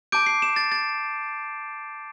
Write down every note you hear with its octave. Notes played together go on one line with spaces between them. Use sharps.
A5 D6 G6 D7
C7
E7
A6
A6